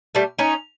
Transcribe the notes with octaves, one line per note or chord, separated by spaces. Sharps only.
G3 A3
C#4 D#4